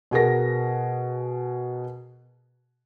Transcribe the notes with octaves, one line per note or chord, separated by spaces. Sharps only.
B2 G#4 A#4 A#6